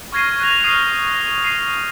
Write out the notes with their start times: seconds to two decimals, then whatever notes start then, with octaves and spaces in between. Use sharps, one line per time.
0.12 C#6 F6 G#6 A#6 C7 D#7
0.40 F#6 G#6 A#6 F7
0.64 D#6 F6 G6 C7 D#7
1.07 A#6
1.44 C7 D#7